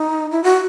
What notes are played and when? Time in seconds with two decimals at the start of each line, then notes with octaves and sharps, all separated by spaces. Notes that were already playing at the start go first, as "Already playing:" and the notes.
Already playing: D#4
0.32 E4
0.44 F#4